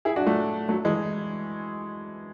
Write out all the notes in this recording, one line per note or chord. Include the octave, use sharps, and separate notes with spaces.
E4 G#4
D4 F#4
F#3 A3
F#3 A3
E3 G#3